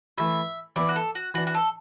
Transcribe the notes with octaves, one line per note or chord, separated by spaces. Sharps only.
E3 A3 E4 E5
E3 B3 E4 D5
F#4
A4
F#4
E3 D4 F#4
F#4
A4